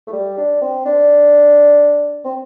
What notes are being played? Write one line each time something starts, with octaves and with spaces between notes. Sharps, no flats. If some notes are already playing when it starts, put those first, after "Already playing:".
A3
G3
D4
C4
D4
C4